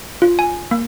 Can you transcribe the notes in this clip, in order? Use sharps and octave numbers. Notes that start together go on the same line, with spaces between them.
F4
G#5
A#3